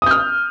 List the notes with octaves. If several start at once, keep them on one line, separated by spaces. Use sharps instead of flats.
D#6 F6 G6